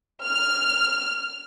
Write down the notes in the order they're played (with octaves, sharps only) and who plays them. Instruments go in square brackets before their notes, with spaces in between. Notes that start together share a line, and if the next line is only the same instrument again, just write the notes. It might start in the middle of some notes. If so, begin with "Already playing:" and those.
[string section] F6